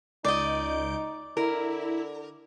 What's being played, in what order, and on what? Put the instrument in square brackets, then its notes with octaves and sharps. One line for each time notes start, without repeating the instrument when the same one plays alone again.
[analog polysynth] C#2 G6 D7 [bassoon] D#4 [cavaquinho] D5 D#5
[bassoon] D3 [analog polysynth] E4 [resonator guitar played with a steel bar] A#4